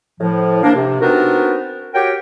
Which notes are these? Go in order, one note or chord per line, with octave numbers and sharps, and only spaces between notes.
A2 F3
A#3 D4
C3
B3 C4 D4 D#4 F#4 A#4
F#4 G4 A#4 C#5 G5